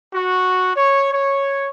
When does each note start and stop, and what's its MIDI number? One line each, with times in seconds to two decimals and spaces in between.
0.14 0.71 66
0.77 1.13 73
1.13 1.70 73